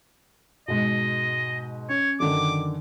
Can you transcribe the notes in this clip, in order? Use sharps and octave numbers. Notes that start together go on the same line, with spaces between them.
G#2 B2 D#5
C#4 C#5
F#2 D3 D#3 D6